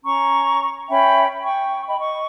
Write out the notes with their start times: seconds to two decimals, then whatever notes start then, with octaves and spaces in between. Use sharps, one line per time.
0.05 C#4 A#5 C#6
0.90 C#4 E5 G5 B5
1.42 G5 C#6
1.86 D#5 G5 B5
1.98 D#5 C#6